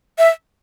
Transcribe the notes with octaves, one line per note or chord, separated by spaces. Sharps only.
E5